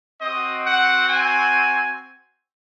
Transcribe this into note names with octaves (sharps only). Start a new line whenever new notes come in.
C4 F#4 D#5
F#5
G#5